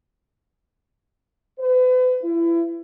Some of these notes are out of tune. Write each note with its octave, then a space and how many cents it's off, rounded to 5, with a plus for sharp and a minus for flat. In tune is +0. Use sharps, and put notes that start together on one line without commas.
B4 +40
E4 +30